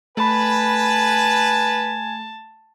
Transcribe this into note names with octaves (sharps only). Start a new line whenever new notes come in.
A3 B4 G#5 A5 B5